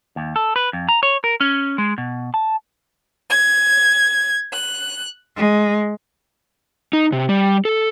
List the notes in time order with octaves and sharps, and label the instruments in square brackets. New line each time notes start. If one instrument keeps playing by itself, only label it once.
[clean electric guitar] D#2
A4
B4
F2
A#5
C#5
A#4
C#4
G#3
B2
A5
[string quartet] G#6
F#6
G#3
[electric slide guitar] D#4
C3
G3
A4